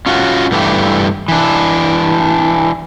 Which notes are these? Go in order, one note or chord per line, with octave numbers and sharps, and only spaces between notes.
C#4 F4 F#4
G2 E3 A3 G4
E3 D4